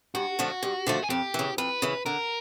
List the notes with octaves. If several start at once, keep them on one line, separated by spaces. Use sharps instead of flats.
G2 F#4
D3 F3 A3
G2
D3 F3 A3
G#4
F2 G4
C#3 E3
F2 B4
C#3 E3
D3 A#4